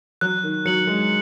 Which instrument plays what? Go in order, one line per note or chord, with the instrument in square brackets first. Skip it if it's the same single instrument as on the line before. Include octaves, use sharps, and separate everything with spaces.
[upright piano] F#3 [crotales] F#6
[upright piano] D#3
[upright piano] F#3 [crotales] C#7 F#7
[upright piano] G#3